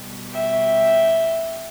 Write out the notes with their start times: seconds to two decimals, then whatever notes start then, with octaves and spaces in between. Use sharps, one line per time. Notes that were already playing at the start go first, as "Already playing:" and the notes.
Already playing: B2 G3
0.33 E5 G5